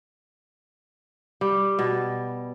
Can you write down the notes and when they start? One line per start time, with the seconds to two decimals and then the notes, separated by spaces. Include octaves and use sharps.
1.41 G3
1.79 B2